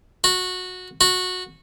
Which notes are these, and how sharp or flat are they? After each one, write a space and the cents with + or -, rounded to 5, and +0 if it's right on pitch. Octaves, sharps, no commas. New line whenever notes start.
F#4 -15
F#4 -15